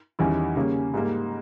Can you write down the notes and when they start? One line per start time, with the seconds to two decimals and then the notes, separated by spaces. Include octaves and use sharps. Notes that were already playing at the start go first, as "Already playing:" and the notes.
0.19 E2 D#3 G3 C#4 E4
0.56 C#3 G3 A#3 C#4
0.94 G#2 G3 A#3